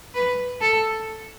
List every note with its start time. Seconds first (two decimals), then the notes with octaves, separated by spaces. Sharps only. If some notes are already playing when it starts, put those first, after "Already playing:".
0.15 B4
0.61 A4